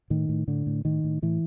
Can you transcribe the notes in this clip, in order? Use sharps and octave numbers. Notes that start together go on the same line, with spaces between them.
A2 D#3
A2
A2 D3
A2
A2 D#3
A2
A2 E3